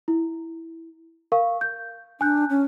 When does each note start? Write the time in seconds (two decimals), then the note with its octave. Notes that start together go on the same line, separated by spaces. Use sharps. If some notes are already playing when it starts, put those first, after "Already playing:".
0.08 E4
1.32 A#4 F5 C#6
1.61 G6
2.21 D4 G#5 F#6 G6
2.50 C#4